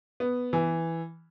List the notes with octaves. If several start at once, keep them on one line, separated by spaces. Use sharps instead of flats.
B3
E3